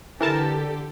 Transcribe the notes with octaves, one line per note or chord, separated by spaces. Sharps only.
D3 E3 G4 A4 A#4 A5